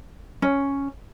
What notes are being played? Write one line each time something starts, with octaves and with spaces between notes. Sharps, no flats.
C#4